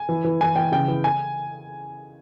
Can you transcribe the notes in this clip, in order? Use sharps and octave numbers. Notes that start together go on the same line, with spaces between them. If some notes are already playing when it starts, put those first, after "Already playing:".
Already playing: G#5
E3
E3
E3 G#5
E3 G5
C#3 G5
E3
G#5